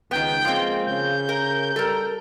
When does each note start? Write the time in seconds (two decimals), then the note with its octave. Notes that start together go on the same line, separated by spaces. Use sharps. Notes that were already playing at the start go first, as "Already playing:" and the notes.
0.11 C#2 D#3 B3 G5
0.45 F3 G#3 A#3 C4
0.86 C#3 G6
1.29 A#4
1.76 G3 A4 A#4